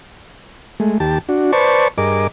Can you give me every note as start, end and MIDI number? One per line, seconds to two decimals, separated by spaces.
0.80 0.98 56
0.80 0.98 57
1.00 1.18 39
1.00 1.18 67
1.00 1.18 81
1.29 1.52 62
1.29 1.52 66
1.52 1.88 71
1.52 1.88 72
1.52 1.88 74
1.52 1.88 81
1.52 1.88 85
1.98 2.27 43
1.98 2.27 68
1.98 2.27 70
1.98 2.27 75
1.98 2.27 86